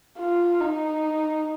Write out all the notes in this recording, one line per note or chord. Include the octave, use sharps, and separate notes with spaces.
F4
D#4